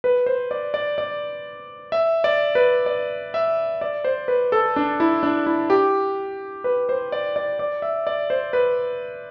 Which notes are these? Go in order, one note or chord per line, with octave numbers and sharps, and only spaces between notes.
B4
C5
D5
D5
D5
E5
D5
B4
D5
E5
D5
C5
B4
A4
D4
E4
D4
E4
G4
B4
C5
D5
D5
D5
E5
D5
C5
B4